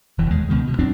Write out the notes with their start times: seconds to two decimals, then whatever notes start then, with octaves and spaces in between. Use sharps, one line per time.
0.18 E1 E3
0.30 D#2 G#3
0.49 C#2 B2 D#3 G#3
0.67 B2
0.79 F#2 F#3 C4 D4